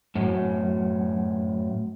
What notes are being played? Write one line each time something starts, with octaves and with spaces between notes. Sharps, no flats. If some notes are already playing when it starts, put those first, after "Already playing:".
F#2 A2